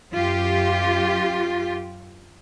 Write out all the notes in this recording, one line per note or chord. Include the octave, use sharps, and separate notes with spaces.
F#2 F4 G4